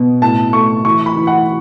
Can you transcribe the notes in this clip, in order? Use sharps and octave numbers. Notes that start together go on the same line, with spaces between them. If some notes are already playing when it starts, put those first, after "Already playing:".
Already playing: B2
A2 A5
A3 C#6
E3 C#6
B5
E3
F#5